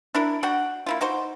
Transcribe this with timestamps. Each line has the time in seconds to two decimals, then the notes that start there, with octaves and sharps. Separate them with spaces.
0.15 D4 E4 A#4
0.43 D4 F#4 F#5 G5
0.86 A#3 E4 F4
1.01 D#4 F#4 C5